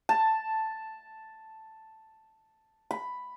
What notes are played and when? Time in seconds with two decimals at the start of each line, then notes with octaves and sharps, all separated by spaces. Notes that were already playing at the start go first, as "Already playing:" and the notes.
0.09 A5
2.91 B5